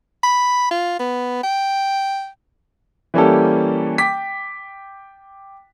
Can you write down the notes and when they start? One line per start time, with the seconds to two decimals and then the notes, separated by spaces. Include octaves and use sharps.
0.24 B5
0.71 F4
0.99 B3
1.43 G5
3.14 E3 G3 A#3 C#4 G4 A4
3.98 G5 D6 B6